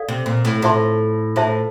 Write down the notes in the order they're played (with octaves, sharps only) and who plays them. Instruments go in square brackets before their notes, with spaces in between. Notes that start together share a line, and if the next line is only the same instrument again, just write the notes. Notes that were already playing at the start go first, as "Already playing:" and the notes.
Already playing: [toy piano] A4 D5 F5
[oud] C3
A#2
A2
[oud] A2 [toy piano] F4 C5 E5 A5 C6
[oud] A2 [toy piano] F4 C5 E5 A5